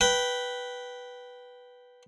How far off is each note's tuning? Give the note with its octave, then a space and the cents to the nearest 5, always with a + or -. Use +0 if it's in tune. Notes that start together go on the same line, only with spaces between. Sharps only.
B4 -5 G5 -10